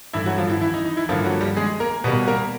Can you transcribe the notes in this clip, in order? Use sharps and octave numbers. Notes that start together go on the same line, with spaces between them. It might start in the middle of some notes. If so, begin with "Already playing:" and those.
G2 E3 A3 E4
F#3 F#4
F3 F4
E3 E4
E3 E4
D#4
D#4
E3 E4
G2 D3 F3 A#3 F4
F#3 F#4
G3 G4
G#3 G#4
A#3 A#4
B2 G3 A#3 B3 B4
A#3 A#4